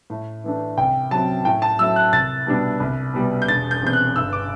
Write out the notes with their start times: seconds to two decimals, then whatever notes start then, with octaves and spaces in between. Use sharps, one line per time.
0.10 A2
0.44 E3 A3 D4
0.78 C2 G5
1.11 C3 F#3 A5
1.45 A2 G5
1.62 A5
1.79 F#3 A3 E4 E6
1.96 F#6
2.13 C2 A6
2.47 B2 G3 D4
2.80 C2
3.14 B2 G3 B3
3.42 G6
3.48 E1 A6
3.71 G6
3.82 E2 C3 G6
3.93 F#6
4.16 G1 E6
4.33 D6